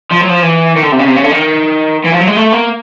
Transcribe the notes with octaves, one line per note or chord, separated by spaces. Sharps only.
F3
F#3
F3
E3
D#3
D3
C3
C#3
C3
C#3
D3
D#3
E3
F3
F#3
G#3
A3
A#3